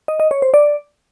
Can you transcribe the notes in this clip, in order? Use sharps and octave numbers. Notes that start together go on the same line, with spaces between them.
D#5
D#5
C#5
C5
D5